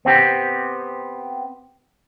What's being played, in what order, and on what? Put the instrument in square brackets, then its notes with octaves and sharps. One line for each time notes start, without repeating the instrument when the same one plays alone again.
[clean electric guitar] B3 C4 G4